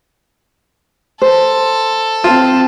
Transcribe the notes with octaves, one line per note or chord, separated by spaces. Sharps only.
A4 C5
C4 F4 A5